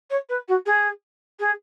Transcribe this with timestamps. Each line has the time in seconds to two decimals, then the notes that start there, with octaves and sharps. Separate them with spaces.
0.10 C#5
0.29 B4
0.48 F#4
0.66 G#4
1.39 G#4